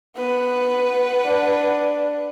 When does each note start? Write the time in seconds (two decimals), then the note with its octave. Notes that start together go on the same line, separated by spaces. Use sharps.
0.17 B3 B4 F#5
1.25 D4